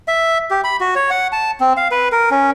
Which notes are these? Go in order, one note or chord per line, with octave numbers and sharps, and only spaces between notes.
E5
G4
B5
F#4
C#5
F#5
A5
C4
F5
B4
A#4
C#4